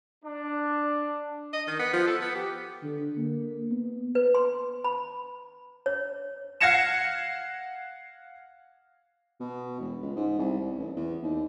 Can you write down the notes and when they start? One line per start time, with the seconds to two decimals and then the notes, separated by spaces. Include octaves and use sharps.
0.25 D4
1.53 D#5
1.67 D#3
1.79 B3
1.94 F3
2.07 A4
2.22 B3
2.35 G4
2.84 D3
3.17 A#3
3.71 B3
4.15 B4
4.35 C6
4.84 B5
5.86 C#5
6.60 F5 F#5 G#6 A#6 C#7 E7
9.40 B2
9.80 E1
10.02 C#2
10.16 G#2
10.39 C2
10.60 C2
10.78 A1
10.96 E2
11.23 D#2